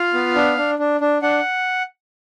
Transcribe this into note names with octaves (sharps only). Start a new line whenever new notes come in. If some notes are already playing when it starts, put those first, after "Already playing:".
Already playing: F4 F5
B3
D4
D4
D4
D4
D4 F#5